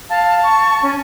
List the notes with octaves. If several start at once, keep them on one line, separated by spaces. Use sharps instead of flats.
F5 A5
C#6
C#4